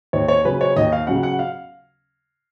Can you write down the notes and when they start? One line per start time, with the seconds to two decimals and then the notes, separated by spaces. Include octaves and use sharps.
0.13 D#2 C#5
0.28 C#5
0.45 C#3 F#3 C#4 B4
0.61 C#5
0.76 D#2 D#5
0.92 F5
1.07 C#3 F#3 C#4 F#5
1.23 F#5
1.39 F5